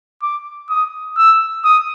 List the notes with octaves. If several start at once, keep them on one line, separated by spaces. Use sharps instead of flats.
D6
D#6
E6
D#6